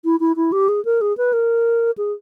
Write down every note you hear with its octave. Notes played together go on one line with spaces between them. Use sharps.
E4
E4
E4
G4
G#4
A#4
G#4
B4
A#4
G#4